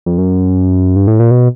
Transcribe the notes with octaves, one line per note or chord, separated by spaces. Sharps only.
F2
F#2
G2
A2
A#2
B2